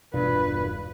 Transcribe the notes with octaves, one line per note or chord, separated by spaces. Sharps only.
E1 G2 B2 D4 F4 B4